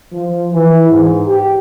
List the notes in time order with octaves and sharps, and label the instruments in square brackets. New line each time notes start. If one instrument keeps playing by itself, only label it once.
[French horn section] F3
E3
G#2
G4